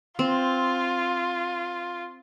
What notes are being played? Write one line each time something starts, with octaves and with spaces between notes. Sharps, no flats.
C4 F4